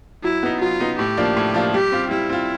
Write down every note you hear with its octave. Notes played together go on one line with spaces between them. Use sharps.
F#3 E4
B3 D#4
F#3 F4
B3 D#4
A2 G4
F3 A#3 D4 F4
A2
F3 A#3 D4 F4
G3 G4
C4 F4
G3 E4
C4 F4